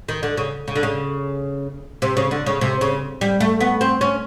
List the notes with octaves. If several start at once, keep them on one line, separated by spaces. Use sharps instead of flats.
D#3
D3
C#3
C#3
D3
C#3
C3
C#3
D3
C#3
C3
C#3
G3
A3
B3
C4
C#4